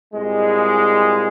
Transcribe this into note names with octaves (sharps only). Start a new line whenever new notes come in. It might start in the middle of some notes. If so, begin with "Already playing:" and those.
C2 A#2 G#3